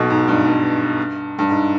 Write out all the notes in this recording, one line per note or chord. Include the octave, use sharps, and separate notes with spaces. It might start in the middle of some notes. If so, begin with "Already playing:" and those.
Already playing: B1 B2
G#2
G2
G2
G2
G#2